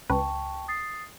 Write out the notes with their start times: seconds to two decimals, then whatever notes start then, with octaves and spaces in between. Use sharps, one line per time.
0.10 C#2 B4 G5 A5 C#6
0.68 D#6 A6 C7